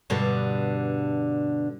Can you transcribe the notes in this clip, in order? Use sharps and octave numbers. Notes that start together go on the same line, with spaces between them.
G2 B2 D3